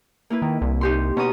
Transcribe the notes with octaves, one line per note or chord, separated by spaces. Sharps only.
A#3 E4 B4
D#3
C2
D#4 G4 C6
B2 C#4 A#5 D#6